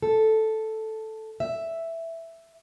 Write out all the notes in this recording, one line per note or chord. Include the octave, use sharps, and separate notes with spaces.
A4
E5